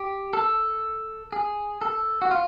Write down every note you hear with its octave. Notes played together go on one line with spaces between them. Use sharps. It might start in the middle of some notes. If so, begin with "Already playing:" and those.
Already playing: G4
A4
G#4
A4
F#4
F4